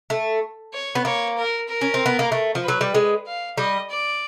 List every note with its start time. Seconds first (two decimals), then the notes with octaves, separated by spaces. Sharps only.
0.10 A3
0.73 C#5
0.95 B3
1.05 A#3 C#5
1.37 A#4
1.68 A#4
1.81 C#4
1.94 C4
2.06 B3
2.19 A#3
2.32 A3
2.55 F3
2.62 B4
2.68 F#3
2.81 G3
2.95 G#3
3.27 F5
3.58 G3 D#5
3.90 D5